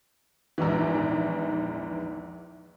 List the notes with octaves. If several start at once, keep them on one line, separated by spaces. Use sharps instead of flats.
A#1 E2 G#2 D#3 E3